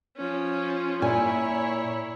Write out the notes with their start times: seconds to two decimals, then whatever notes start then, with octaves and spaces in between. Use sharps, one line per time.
0.17 F3 C#4
1.02 A#2 E4 C#5 G#5